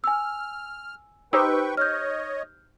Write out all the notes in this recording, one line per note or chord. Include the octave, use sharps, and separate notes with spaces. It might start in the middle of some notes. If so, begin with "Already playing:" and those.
G#5 E6 F6
D#4 G4 B4 C5 G5 C#6 E6
C#5 D#5 F6 G6